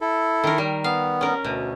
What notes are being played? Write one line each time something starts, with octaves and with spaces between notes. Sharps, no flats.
E4 A4
D#3 A#4
G3
B3 F5
C#4 A#4
D2 B2